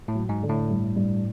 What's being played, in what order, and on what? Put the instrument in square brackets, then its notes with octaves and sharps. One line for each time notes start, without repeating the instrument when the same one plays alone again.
[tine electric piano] A2
[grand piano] F#3
[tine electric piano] G#2
[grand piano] D3
[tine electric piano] A2
[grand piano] G2
G2